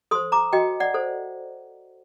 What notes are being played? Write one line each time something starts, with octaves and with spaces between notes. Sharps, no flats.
A4 C5 C6 D#6
A#5 D6
F#4 D#5 G5
D5 F#5
A4 C5